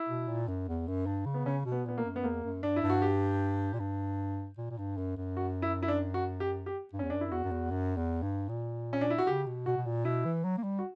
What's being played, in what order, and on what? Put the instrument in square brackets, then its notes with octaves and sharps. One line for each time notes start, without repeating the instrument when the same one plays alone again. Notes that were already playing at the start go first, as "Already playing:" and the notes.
Already playing: [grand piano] E4
[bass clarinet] B2
A#2
F#2
E2
F#2
G2
C#3
[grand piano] B3
[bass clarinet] C#3 [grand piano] C#4
[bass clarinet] B2
[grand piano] B3
[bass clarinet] A#2 [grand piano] B3
[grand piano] A#3
[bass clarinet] F#2
[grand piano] B3
[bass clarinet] E2 [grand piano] A#3
[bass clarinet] F#2
[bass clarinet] G2 [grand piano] D4
[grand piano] E4
[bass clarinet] G2
[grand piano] F#4
G4
[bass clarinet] A#2
G2
A#2
A#2
G2
F#2
F#2
[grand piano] F#4
E4
E4
D4
F#4
G4
G4
[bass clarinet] G2
[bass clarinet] E2 [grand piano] C#4
[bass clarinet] F#2 [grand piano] D4
[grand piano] E4
[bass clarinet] E2 [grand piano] F#4
[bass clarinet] F#2
E2
F#2
E2
G2
A#2
[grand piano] C#4
D4
E4
F#4
[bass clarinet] C#3 [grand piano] G4
[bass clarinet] B2
[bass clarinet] B2 [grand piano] F#4
[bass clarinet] B2
A#2
[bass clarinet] B2 [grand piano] E4
[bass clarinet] E3
F#3
A#3
G3
[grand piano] F#4